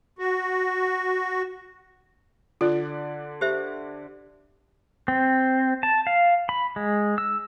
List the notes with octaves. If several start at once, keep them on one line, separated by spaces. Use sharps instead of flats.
F#4
D3 F4 D5 F#6
G4 C5 E5
C4
A5
F5
B5
G#3
E6